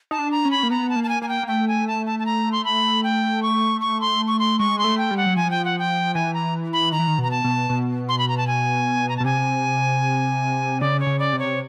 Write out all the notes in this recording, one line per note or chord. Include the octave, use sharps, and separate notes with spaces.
D#4 A5
D4
A#5
C#4
B5
A#3
B3 A#5
A5
A#3
A5
G#5
A#3 G#5
G5
A#3
A3 G5
G#5
A5
A5
A5
A#5
C6
B5
G5
C#6
C#6
C6
C#6
C6
G#3 C#6
C6
A3
G5
G3
F#5
F#3
F3 G#5
G5
F#5
G5
E3 G#5
A#5
B5
D#3 A#5
E3
D#3
B2
A#5
A5
B2
B2
C6
B5
A#5
A5
G#5
A#5
A5
B2
C3 G#5
C#3 D5
C#5
C#3
D5
C3
C#5